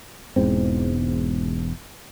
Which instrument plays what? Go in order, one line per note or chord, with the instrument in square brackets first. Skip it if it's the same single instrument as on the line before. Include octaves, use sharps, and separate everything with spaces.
[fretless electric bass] E1 E2 G#2 C4